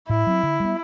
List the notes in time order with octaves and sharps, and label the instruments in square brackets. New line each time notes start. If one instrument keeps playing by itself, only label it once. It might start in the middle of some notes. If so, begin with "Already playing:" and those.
[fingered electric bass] A2 [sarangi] E4
[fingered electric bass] F#3 C4
D3
G3 B3